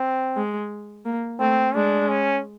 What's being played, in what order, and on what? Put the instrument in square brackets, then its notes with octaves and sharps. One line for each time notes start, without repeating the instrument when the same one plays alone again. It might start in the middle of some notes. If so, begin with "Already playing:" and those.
Already playing: [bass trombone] C4
[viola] G#3
A#3
[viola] A3 [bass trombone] C4
[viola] G#3 [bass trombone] D4
[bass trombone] C#4